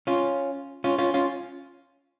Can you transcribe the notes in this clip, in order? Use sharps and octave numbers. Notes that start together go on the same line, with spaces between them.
C#4 F4
C#4 F4
C#4 F4
C#4 F4